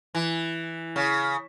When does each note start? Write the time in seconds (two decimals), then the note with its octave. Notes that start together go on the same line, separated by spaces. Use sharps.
0.15 E3
0.96 C#3